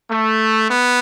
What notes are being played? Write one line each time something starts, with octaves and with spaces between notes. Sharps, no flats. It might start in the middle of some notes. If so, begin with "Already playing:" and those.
A3
B3